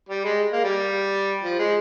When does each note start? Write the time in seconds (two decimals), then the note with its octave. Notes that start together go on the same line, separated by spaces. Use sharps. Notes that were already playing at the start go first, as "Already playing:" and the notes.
0.09 G3
0.25 G#3
0.53 A#3
0.64 G3
1.42 F3
1.59 G#3